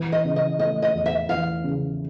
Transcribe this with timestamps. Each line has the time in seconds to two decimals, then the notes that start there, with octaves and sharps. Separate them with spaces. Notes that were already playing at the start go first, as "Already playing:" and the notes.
Already playing: E3
0.12 D#5
0.25 C#3
0.36 D#5
0.59 A3 D#5
0.82 D#5
0.94 E2
1.06 E5
1.29 E3 F5
1.64 C#3